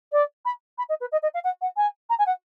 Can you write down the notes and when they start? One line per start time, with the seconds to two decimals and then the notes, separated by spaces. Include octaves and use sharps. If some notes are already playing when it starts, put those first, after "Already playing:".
0.12 D5
0.45 B5
0.78 B5
0.89 D#5
1.00 B4
1.12 D#5
1.22 D#5
1.34 F5
1.44 F#5
1.61 F#5
1.76 G#5
2.09 A#5
2.18 G#5
2.26 F#5